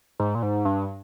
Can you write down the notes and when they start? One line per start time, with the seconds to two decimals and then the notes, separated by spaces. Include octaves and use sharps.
0.20 G#2
0.35 A#2
0.43 G#2
0.65 G2